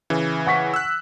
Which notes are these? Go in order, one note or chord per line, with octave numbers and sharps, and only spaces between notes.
C#3 E3
F#5 C#6 B6
E6 F#6